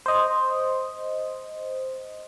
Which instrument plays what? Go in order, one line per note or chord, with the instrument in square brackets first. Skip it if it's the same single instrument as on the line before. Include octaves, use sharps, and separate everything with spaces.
[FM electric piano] C5 D#5